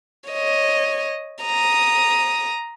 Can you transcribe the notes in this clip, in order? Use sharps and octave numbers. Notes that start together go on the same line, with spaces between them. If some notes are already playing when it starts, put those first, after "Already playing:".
C#5 D#5
A#5 D#6